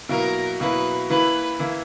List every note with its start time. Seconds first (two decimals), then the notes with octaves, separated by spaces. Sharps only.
0.09 B2 F#3 A#3 E4 A#4
0.60 B2 F#3 A#3 E4 B4
1.09 E3 A#3 E4 B4
1.59 E3 A#3 E4